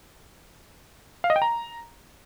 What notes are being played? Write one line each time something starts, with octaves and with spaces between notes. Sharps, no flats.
F5
D#5
G5
A#5